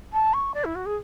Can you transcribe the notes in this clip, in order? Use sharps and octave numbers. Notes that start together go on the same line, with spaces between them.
A5
C#6
D5
E4
F#4
G#4